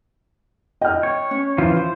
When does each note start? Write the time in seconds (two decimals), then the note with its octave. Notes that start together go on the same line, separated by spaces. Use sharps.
0.81 D#5 G5 F6
1.03 C#5
1.31 C#4
1.58 E3 F3 F4
1.77 C5